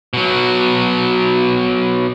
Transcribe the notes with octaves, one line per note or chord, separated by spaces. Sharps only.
B2 F#3